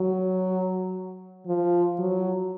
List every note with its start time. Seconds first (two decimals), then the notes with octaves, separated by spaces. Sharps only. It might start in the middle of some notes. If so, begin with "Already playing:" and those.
Already playing: F#3
1.47 F3
1.99 F#3